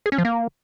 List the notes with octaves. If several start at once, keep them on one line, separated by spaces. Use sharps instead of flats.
G#4
C#4
F3
A#3